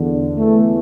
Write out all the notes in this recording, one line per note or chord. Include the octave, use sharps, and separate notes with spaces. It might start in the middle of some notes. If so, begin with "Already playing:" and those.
Already playing: E2 D3
E2 E3 A3